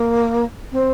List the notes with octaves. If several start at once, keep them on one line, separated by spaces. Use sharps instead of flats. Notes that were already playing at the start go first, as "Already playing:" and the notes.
Already playing: A#3
C4